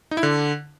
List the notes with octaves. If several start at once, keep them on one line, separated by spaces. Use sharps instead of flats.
D#4
E4
D3